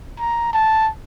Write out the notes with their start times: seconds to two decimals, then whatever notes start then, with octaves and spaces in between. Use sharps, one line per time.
0.19 A#5
0.53 A5